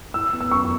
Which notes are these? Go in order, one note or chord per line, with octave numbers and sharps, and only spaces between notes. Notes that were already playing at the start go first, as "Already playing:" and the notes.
E4 E6
B3
E6
F#2 C#6